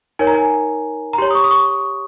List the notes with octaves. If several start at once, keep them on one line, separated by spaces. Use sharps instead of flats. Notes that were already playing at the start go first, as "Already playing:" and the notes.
D#4 A#4 C#5 G#5
A#5
G#5
A#5
G4 C#5 C6
D#6
C#6
D#6
C#6